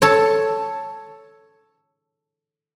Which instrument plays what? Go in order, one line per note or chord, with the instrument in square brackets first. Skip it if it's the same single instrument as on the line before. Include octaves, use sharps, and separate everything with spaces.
[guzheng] A4 C#5